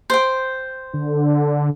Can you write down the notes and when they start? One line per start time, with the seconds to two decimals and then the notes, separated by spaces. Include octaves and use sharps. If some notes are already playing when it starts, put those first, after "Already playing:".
0.10 C5 G5
0.94 D3